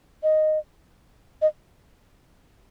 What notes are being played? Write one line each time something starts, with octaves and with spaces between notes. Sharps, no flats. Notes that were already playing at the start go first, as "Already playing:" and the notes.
D#5
D#5